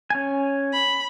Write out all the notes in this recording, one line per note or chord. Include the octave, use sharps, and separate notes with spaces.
C#4 G#5
B5